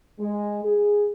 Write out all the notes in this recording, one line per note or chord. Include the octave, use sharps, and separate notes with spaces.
G#3
G#4